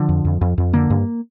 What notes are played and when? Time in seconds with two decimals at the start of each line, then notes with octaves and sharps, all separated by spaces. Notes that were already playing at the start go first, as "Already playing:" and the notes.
Already playing: D3 F3
0.09 F2
0.25 F2
0.41 F2
0.58 F2
0.73 D3 A#3
0.90 G2